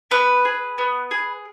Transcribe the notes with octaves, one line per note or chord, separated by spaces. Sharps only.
B3 B4
G#4
B3
G#4